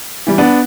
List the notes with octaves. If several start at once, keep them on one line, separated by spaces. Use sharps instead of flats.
E3 G3
B3 D4